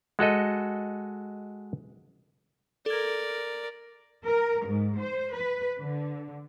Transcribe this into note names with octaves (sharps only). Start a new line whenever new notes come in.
G#3 F#4 A4 D#5
A4 A#4 D5 G#6
A#4
G#2
C5
B4
D3